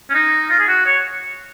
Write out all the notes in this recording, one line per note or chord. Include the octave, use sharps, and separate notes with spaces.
C#4
D#4
F4
G#4
F#4
C#5